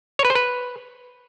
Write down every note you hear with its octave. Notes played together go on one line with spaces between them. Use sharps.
C#5
B4
C5
B4